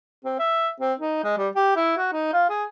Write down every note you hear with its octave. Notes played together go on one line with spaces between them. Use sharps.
C4
E5
C4
D#4
G#3
G3
G4
E4
F#4
D#4
F4
G#4